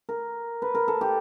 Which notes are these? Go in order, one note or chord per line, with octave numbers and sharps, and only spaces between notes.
A#4
B4
A#4
A4
G4